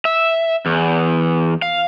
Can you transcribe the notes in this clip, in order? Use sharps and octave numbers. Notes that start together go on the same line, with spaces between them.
E5
E2
F5